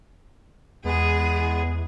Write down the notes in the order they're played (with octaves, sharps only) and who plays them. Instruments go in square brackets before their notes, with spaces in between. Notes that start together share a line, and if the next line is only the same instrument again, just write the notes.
[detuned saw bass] E2 [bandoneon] G#3 B3 [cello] G#4